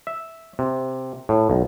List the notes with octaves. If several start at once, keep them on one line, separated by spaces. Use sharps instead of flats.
E5
C3
A2
B1